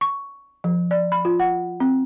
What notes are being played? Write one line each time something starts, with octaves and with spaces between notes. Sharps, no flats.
C#6
F3
D5
B5
F4
F#5
C4